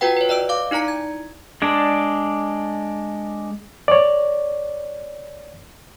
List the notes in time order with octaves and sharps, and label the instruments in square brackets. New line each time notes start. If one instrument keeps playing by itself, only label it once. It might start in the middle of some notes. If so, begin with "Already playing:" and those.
[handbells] F4 F#4 B4 F#5 G5
B4 C#5
D5 D#5 E6 D7
F5 D6
D#4 E4 D5 A#5 C#7
G#6
[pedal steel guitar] G#3 D4 D5
[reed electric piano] C#5 D5